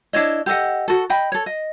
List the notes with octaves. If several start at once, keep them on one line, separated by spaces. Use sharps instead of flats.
D4 E4 C#5 D#5
G4 A4 D#5 F#5
F#4 A4
D#5 G5 B5
A4 C#5
D#5